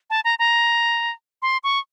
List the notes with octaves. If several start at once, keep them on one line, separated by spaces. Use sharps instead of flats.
A5
A#5
A#5
C6
C#6